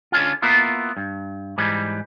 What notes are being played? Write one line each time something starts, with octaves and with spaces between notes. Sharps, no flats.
D3 C#4 F4
A#3 B3 E4 F4
G2
G#2 E3 G3